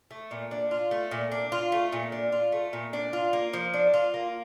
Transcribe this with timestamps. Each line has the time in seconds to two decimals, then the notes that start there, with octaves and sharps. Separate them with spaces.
0.11 A3
0.31 A#2
0.51 D4
0.71 F4
0.91 A3
1.11 A#2
1.32 D4
1.52 F4
1.72 A3
1.92 A#2
2.12 D4
2.32 F4
2.52 A3
2.73 A#2
2.93 D4
3.13 F4
3.33 A#3
3.53 F3
3.74 D4
3.94 F4
4.14 A#3